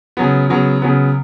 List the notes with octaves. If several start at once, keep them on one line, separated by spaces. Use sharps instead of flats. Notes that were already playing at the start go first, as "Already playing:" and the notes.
C#3 F#3 B3
C#3 F#3 B3
C#3 F#3 B3